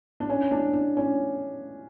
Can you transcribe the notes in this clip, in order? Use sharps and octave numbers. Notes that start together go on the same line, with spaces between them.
D4
C#4
D4
D4
C#4